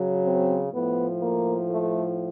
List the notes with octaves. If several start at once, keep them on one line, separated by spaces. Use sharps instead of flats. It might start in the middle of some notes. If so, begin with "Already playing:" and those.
Already playing: C#3 F#3
C4
A2 F3 B3
A#3
A3